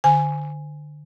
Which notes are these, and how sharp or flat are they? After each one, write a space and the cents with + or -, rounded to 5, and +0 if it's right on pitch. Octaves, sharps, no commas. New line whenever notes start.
D3 +25 G#5 +0